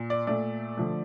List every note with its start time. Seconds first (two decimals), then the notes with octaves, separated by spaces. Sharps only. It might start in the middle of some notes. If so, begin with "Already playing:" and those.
Already playing: A#2
0.10 D5
0.27 A#2 A3 D5
0.77 D3 F3 A3